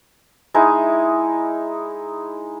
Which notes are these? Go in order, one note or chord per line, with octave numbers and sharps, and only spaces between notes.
G#3 D#4 E4